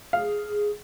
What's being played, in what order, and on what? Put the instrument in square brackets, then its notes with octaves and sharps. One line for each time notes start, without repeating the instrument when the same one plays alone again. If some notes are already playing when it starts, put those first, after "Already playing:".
[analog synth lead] G#4 [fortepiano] F5